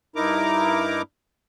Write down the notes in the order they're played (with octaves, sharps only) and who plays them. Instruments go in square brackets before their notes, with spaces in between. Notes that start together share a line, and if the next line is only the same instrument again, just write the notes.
[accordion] G2 D#4 E4 A#4 A#5 D6